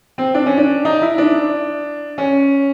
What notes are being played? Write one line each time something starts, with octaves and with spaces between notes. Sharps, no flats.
C4
D4
C#4
D4
D#4
E4
D4
C#4